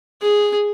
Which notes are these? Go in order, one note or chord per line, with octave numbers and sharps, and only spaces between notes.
G#4